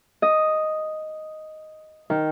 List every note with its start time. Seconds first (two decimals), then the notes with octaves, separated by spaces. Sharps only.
0.22 D#5
2.10 D#3